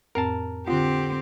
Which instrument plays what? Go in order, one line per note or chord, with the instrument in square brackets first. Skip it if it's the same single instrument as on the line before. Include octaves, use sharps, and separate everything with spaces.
[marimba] F2 A2 C4 [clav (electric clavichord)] A#4 A5
[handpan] D3 F#5 [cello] C4 G4 [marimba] F4